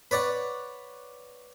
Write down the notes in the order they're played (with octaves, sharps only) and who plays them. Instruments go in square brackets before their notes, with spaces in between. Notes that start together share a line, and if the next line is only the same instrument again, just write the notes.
[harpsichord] B4 C#5 D5 F#5